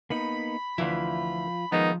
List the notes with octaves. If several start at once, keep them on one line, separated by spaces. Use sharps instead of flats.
A#3 B3 D#4 B5
D2 E3 F3 E4 F4
D#3 F3 G#3 B3 D#4